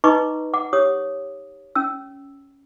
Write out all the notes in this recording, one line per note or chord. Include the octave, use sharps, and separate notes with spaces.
D#4 B4 D#5 A#5 C#6 D6
F#5 D6
G4 C#5 D#6
C#4 E6